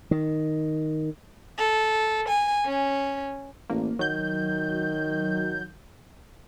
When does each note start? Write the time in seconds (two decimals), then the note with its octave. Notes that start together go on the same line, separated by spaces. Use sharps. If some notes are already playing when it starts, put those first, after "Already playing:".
0.11 D#3
1.59 A4
2.29 G#5
2.66 C#4
3.70 A1 A#3
3.99 D#3 F#3 G6